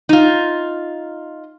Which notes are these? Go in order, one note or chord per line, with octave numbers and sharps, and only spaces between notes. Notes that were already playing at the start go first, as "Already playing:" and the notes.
D#4 F4